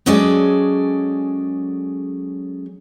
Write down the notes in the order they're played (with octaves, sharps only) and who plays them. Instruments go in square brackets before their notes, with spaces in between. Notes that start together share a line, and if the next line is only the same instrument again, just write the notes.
[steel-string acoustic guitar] F#3 G#3 C#4 G#4 A4 D5